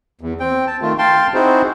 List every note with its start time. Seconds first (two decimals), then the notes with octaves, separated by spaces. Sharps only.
0.21 E2
0.40 C4 G5
0.67 A5
0.82 D#3 A3 F4
0.98 F5 G5 A5 C6
1.34 C4 D#4 E4 F#4 G#4 C5